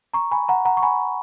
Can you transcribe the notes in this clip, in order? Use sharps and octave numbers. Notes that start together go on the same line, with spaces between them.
A#5 C#6
G#5 B5
F#5 A#5
F#5 A#5
C#6
G#5 B5